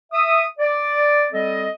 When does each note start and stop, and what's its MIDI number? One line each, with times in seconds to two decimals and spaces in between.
0.13 0.43 76
0.13 0.43 87
0.59 1.27 74
1.32 1.68 55
1.32 1.68 60
1.32 1.68 69
1.32 1.68 75